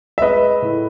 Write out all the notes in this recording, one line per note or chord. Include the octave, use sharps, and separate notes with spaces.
E5
G#3 B4 D#5
A2